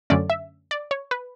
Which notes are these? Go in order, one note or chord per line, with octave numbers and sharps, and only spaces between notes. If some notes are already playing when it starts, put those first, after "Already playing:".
F#2 D3 A3 C#4 D5
E5
D5
C#5
B4